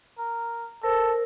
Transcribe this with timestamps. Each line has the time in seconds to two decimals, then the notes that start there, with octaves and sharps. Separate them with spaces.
0.19 A#4
0.83 A4 A#4 C5